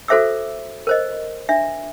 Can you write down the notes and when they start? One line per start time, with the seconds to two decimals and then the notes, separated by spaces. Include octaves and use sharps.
0.08 F#4 A4 C5 E5 D6 E6
0.87 A#4 C5 D#5
1.49 D4 E5